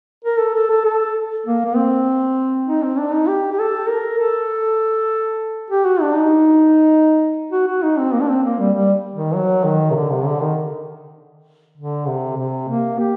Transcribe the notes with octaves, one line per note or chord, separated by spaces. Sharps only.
A#4
A4
A4
A4
A4
A#3
A#3
C4
D#4
C4
D4
D#4
G4
G4
A4
A#4
A4
G4
F#4
D4
D#4
F#4
F#4
D#4
C4
A#3
D4
C4
A#3
G3
G3
D#3
F#3
D#3
C3
D3
C3
D3
D#3
D3
C3
C3
A#3
G4